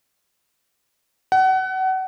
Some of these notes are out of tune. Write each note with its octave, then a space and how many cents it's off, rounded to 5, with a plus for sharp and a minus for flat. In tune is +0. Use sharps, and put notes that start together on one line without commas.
F#5 +30